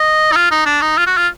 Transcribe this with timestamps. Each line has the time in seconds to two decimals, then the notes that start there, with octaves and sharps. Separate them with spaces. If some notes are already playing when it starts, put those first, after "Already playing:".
Already playing: D#5
0.32 D#4
0.36 F4
0.51 D#4
0.66 D4
0.82 D#4
0.97 F4
1.07 F#4
1.17 F4